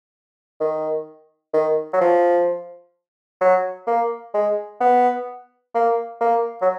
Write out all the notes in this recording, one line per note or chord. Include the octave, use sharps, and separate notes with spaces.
D#3
D#3
F#3
F3
F#3
A#3
G#3
B3
A#3
A#3
F#3